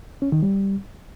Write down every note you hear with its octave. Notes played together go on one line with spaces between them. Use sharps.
C#4
D#3
G3